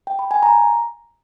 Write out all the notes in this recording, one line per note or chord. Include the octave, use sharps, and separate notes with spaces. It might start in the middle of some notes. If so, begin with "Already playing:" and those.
G5
B5
G#5
A#5